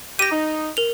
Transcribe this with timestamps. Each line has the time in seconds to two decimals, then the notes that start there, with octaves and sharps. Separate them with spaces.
0.19 G4 A#6 D#7
0.32 D#4
0.77 A#4 F7